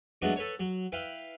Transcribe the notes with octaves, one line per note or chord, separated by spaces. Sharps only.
F#3 G#3 A3 B3 D4 F#4
A4 B4 C#5
F#3
E4 B4 F5 G5